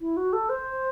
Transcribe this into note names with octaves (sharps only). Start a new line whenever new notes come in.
E4
F#4
A4
C5